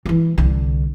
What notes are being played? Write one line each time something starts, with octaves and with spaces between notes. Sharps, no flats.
E3 F#3
C2 D3